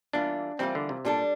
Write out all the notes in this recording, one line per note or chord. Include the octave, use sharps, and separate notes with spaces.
E3 G3 A#3 D4 F4
E3 G3 A#3 C4 F4
D3
C3
A#2 G3 D4 A4